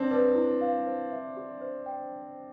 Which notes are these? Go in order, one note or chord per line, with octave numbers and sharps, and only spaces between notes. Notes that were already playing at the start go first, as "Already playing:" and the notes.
Already playing: C4 D4
D4 B4
E4
F5
C5
E5
G4
C5
G5